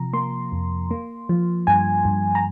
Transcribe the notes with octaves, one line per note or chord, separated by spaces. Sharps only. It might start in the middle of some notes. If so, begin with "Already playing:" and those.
Already playing: C3 F3 A#5
A#3 C6
F2
A#3
F3
G2 G#5
G2
A#5